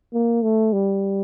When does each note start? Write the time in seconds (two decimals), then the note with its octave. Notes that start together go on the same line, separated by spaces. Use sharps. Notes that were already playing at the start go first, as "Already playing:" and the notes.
0.13 A#3
0.43 A3
0.73 G3